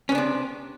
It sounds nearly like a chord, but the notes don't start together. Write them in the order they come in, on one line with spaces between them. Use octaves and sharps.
C#4 B3 D4 C3